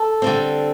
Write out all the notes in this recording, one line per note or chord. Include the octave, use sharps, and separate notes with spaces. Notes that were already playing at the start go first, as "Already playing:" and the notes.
Already playing: A4
D3 G3 C4